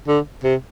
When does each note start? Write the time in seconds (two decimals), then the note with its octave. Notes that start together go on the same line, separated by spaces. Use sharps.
0.08 D3
0.44 C3